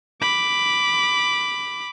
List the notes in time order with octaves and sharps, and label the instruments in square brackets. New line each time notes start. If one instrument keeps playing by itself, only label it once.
[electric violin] B5 D6